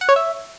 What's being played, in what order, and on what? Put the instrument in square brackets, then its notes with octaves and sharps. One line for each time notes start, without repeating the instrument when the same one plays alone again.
[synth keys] F#5
C#5
E5